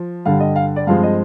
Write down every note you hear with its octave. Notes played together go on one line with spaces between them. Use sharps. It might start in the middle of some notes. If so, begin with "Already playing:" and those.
Already playing: F3
G2 D3 G3 F5
D#5
F5
D5
G2 F3 G#3 C4 F5
D#5